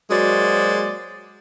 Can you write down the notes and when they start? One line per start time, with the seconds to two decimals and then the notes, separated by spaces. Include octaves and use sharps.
0.10 F#3 G#3 A#3 F#4 C5 D5